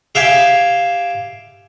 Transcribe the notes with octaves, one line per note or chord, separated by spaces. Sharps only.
G4 E5 F5 G5 G#5